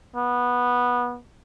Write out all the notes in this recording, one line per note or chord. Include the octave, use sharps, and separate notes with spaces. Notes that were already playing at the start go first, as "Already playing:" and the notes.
B3